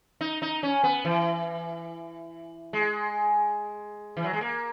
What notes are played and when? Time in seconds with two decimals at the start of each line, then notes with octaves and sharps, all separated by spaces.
0.21 D#4
0.42 D#4
0.63 C#4
0.84 B3
1.05 E3
2.73 G#3
4.17 E3
4.24 F#3
4.33 G#3
4.41 A#3